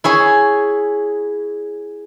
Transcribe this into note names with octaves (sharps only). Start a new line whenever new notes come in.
E4 G#4 C#5